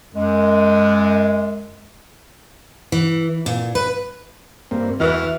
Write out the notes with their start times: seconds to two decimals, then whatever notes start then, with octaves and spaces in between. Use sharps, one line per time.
0.15 F#2 G#3
2.92 E3
3.46 A#2
3.75 B4
4.71 G2 A#3 C4
5.00 E2 E3 F#4 F6